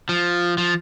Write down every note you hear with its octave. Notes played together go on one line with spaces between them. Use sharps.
F3
F3